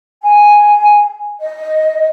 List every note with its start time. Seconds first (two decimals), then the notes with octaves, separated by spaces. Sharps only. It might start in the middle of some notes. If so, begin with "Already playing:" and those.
0.22 G#5
1.40 D#5